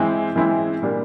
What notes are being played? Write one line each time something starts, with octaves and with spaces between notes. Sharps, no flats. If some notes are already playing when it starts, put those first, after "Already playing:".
Already playing: E3 G#3 C4 E4
E3 G#3 C4 E4
A#2 G3 A#3 D4 G4